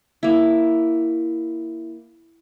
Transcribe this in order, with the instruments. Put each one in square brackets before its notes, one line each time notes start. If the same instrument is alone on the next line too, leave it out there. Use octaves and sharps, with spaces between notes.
[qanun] A#3 E4